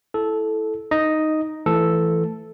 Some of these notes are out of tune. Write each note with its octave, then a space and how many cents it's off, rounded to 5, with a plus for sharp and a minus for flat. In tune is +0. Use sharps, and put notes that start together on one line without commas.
E4 +0 A4 -10
D#4 +0 D#5 +0
E3 +15 A3 +0 A4 +0